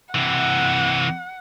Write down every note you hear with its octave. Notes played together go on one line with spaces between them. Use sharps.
C3 E3 F#5